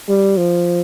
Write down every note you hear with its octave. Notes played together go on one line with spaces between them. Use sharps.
G3
F3